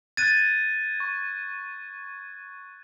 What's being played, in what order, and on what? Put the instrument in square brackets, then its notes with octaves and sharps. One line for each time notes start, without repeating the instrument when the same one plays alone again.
[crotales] F#6 G#6 [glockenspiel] A6 D#7
[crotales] C#6